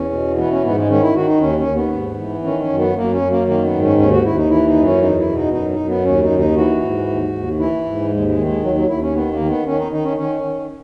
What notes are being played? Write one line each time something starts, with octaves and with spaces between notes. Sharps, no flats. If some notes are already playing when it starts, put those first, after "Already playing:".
Already playing: E2 C#4
B2
E3 B3
C#4
G#2 B3
G#3
D#3 C#4
E4
D#3 F#4
D#4
D#2 C#4
C#4
D#2
B3
G#2
E3
D#3 C#4
C#4
F#2
B3
F#2 A#3
C#4
F#2
A#3
D#3 A#3
B3
G#2
C#4
D#2 C#4
F#4
D#2 E4
D#4
E3 E4
D#4
F#2
C#4
E2 D#4
E4
B2
D#4
F#2 D#4
D#4
F#2
B3
D#2 C#4
D#4
D#2
D#4
E3 F#4
G#2
D#2
D#2
E3 E4
G#2
D#2 G#3
G#3
D#3
G#3
D#2 F#3
F#3
D#2 E4
C#4
D#3 B3
A#3
D#3
B3
D#3 C#4
D#4
D#3 D#4
C#4
D#3 C#4
D#3